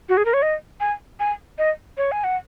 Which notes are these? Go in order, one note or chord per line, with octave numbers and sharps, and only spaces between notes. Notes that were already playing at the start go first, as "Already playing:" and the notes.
F#4
G#4
A#4
C#5
D#5
G#5
G#5
D#5
C#5
G#5
F#5